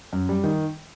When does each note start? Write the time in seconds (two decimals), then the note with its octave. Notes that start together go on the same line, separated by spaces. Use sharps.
0.13 F#2
0.29 G3
0.44 D#3